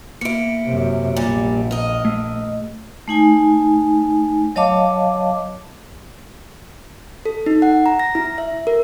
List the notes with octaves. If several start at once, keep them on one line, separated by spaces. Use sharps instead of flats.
A#3 E4 C#7 D7
F#2 C3
A#1 A#2 G3
A#4 D#5
A3
A3 D#4 G#5
F#3 C#5 D#5 F5 A5 D6
A4
D#4
F#5
A#5
A#6
E4
E5
A#4